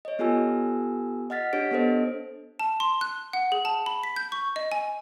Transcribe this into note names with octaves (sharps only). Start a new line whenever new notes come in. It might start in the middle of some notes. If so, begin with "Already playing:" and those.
C#5 D#5
B3 F4 G4 A4 G#5 E6
D#5 F#5 F6 A6 B6
D4 G4 C#5 F#5 B6 D7
B3 D4 A4 C5 D#5
A5
C6
F#6
F#5
G#4
A5
B5
B6
G6
C#6
D#5
G#5